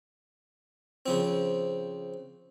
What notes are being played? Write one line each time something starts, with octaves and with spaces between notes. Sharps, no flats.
C#3 F3 C4